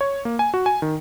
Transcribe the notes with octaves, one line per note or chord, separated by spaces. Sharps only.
C#5
A#3
G#5
F#4
G#5
D#3